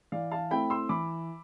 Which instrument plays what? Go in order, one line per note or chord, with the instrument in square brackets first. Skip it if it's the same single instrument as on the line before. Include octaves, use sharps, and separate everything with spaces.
[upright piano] E3 D5 F5
F5 A5
A3 C4 E4 G5 B5
C6 E6
E3 B5 D6